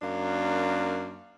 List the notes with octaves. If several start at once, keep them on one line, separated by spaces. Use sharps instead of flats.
F#2 A#3 D4